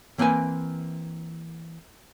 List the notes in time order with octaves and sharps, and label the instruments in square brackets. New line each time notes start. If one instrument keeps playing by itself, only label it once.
[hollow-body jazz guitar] E3 A#3 C4 B4 G#5